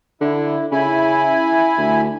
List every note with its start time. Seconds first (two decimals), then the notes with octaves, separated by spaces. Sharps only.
0.21 D3 E4
0.72 C#3 E4 G#5 B5
1.78 D2